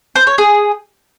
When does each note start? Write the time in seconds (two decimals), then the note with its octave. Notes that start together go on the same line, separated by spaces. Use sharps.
0.16 C5
0.27 C#5
0.38 G#4